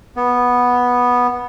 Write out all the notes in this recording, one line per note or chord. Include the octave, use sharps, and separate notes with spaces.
B3